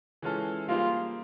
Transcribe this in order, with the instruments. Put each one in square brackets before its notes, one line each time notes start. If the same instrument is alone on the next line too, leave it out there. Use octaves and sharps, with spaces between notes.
[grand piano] E3 G#3 C#4 F4 A4
[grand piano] G3 A#3 D#4 G#4 C5 [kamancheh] F4